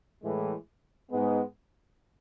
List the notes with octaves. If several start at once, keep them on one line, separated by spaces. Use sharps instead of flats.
A2 E3 G#3
G#2 G#3 B3